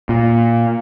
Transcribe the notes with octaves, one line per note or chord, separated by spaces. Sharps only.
A#2